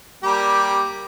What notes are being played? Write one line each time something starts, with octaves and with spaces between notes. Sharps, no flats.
G3 A#3 G4